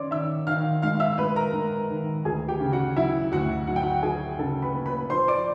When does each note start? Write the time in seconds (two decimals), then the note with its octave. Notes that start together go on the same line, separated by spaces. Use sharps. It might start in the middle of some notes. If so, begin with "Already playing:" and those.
Already playing: D#3 C#4 C#5 D5 C6 D6
0.11 D#3 E5 E6
0.47 D#3 F5 F6
0.82 G#3 F5 F6
1.00 E5 E6
1.18 G#3 B4 B5
1.36 A#4 A#5
1.53 G#3
1.90 D#3
2.25 D2 G#4 G#5
2.48 G4 G5
2.60 C#3
2.72 F#4 F#5
2.96 F#3 E4 E5
3.32 D2 F#4 F#5
3.67 F#3 F#5
3.76 G5
3.83 F#4 F#5
4.03 F#3 G#4 G#5
4.39 C#3 A4 A5
4.62 B4 B5
4.74 A#3
4.86 B4 B5
5.10 F3 C5 C6
5.28 D5 D6